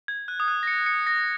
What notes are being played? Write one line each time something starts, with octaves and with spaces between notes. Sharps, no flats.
G#6
F#6
D#6
F#6
A#6
C#7
C#7
A#6